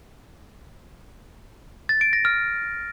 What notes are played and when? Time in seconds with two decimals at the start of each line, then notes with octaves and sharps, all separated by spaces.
1.89 A6
2.01 D7
2.13 A#6
2.25 F6